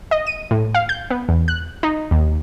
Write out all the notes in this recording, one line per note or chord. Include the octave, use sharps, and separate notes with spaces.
D#5
D#7
A2
F5
G6
B3
E2
F#6
D#4
D#2